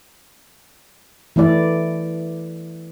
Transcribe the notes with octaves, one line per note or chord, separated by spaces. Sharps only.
E3 A3 E4 D5